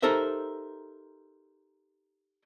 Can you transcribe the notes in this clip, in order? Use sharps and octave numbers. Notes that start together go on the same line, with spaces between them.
D#4 G4 A4 A#4 C5 E5